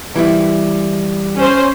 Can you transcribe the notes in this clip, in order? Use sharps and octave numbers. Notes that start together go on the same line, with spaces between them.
E3 G3 E4
C#4 C5